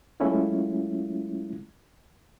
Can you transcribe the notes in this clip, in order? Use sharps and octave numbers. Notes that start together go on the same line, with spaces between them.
F#3 G#3 A3 C#4 E4 F4